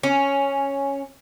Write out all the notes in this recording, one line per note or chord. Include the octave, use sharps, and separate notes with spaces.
C#4